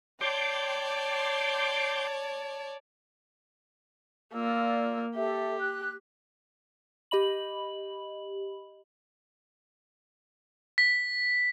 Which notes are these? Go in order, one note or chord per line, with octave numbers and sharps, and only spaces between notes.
C#5 D5 G5 A5 C6 D6
A#3 F4 D5 E6
G4 A4 E5
F#6
G4 D#5 B5 F#7
B6